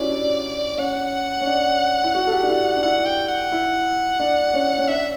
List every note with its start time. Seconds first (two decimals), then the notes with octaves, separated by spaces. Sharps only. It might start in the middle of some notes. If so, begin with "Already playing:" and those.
Already playing: C#4 E4 F#4 G4 D5
0.10 D4
0.77 C#4 F#5
1.40 C#4
1.46 D4
2.03 E4
2.14 F#4
2.27 A4
2.31 G4
2.43 D4
2.48 E4
2.76 D4
2.83 E4 F#5
3.05 G5
3.28 F#5
3.52 E4
4.19 D4
4.53 C#4
4.78 C#4
4.88 D4 E5